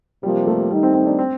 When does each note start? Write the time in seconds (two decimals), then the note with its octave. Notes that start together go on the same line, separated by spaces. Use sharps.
0.23 C3 F3 G3 A#3
0.47 A3
0.71 D#3 G3 A3 D#4
0.83 C4
0.94 C4
1.06 D4
1.19 C4